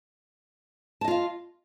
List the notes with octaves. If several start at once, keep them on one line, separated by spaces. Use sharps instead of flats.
F4 D#5 F5 A5